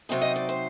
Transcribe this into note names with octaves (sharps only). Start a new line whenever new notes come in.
C3 F#3 C4 D#4
D#5
D5
C5